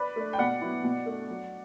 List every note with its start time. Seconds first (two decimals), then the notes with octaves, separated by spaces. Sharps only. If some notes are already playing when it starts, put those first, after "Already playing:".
Already playing: B4 D5
0.16 A3 D4
0.33 G5
0.38 B2 D5 F#5
0.61 F#3 B3 E4
0.83 B2
1.06 A3 D4
1.29 F#3